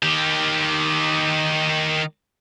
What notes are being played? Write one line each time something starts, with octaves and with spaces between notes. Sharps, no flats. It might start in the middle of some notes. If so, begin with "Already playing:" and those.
D#3 G4